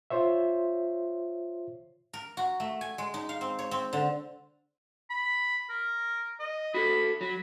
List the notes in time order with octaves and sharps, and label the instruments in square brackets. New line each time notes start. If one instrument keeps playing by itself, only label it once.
[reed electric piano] F4 C5 C#5 E5
[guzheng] A#4
F#4
A3
G#5
G#3
D#4
F5
C4
C#5
C4
D3
[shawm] B5
A#4
D#5
[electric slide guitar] F#4 A4 [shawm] B5
[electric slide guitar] F#3 [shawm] B5